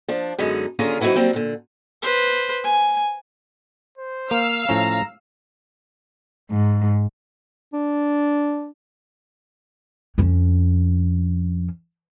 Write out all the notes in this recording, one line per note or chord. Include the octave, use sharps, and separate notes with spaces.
F3 D4
F#2 D3 G#3 B3 D#4
D#2 D3 C#4 F4 G#4 A#5
F#3 C4 D#4 E4 F#4 B4
F#3 G3 A#3 C4
A#2 D3
B4 C5
G#5
C5
A#3 F5 E6 F6
A2 F3 C#4 A#5
G#2
D4
F2 C#4